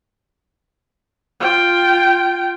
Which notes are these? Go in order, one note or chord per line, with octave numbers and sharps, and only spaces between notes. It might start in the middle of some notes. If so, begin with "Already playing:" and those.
F4 G5